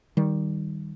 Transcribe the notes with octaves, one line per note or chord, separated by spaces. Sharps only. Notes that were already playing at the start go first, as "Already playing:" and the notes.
D#3 G3